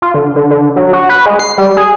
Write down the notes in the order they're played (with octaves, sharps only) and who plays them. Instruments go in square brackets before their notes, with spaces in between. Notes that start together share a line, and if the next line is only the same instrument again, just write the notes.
[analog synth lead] F4
D3
D3
D3
F#3
F#4
B4
G#3
C7
G3
G#4